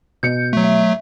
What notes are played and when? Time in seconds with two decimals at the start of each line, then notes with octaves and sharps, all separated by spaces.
0.23 B2 G6 C#7
0.53 F#3 A3
0.64 E5